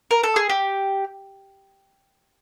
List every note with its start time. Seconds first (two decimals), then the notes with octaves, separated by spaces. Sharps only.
0.11 A#4
0.23 A4
0.36 G#4
0.49 G4